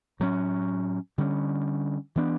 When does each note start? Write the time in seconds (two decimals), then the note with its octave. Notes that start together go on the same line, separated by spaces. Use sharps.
0.20 A2 F#3 C#4
1.18 D3 G3 C#4
2.16 E3 B3 D4